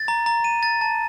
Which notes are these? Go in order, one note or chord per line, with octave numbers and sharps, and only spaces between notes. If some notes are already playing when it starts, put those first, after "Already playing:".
Already playing: A6
A#5
A#5
D#7
A6
A5